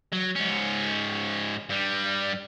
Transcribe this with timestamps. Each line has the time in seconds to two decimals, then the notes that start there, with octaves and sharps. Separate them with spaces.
0.12 F#3
0.35 G#2 C#4
1.70 G2 G3